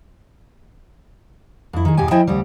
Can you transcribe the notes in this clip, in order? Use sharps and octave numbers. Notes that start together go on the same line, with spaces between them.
F2 E4
D#3 G#4
E2 G2 B2 G4 G#5
F3 E4 D#5 E5 G5 G#5
D2 C#3 G3